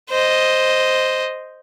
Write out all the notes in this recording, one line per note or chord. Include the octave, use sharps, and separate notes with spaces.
C5 D#5